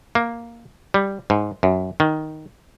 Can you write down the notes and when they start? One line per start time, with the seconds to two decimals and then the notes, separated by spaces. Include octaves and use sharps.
0.15 A#3
0.94 G3
1.30 G#2
1.63 F#2
2.00 D#3